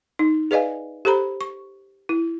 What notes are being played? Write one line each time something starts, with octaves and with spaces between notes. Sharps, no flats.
D#4
G#4 B4 D5 D#5 F5 G#5
G4 A4 C5 A#5 B5
C#6
E4